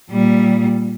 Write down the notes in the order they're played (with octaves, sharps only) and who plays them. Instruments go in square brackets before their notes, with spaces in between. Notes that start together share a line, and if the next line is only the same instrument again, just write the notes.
[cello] A#2 G3